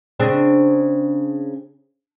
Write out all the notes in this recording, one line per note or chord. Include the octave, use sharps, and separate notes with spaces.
C#3 C4 D4